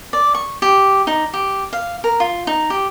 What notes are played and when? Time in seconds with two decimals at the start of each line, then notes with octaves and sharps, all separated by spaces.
0.13 D5
0.35 C#6
0.62 G4
1.07 D#4
1.33 G4
1.73 F5
2.04 A#4
2.20 F4
2.47 D#4
2.70 G4